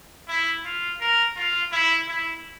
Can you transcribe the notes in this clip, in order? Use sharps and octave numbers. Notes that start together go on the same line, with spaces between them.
E4
F4
A#4
F4
E4
E4